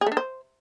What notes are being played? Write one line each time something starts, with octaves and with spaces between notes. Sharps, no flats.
G#4
A3
D4
C5